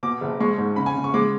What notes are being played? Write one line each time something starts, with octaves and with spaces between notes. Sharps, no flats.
B2 D6
F#1
G#3 C#6
G#2
C#3 B5
G#5
C#3
C#6
G#3 D6